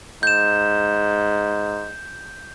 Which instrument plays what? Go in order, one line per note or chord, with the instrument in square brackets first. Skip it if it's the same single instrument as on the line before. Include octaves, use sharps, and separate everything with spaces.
[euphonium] G#2 [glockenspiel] G6 E7